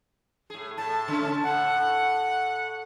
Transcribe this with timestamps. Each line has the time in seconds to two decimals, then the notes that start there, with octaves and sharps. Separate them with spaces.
0.50 A2 G#4
0.78 A2 A5
1.08 C#3 A3 C#4
1.44 A2 F#5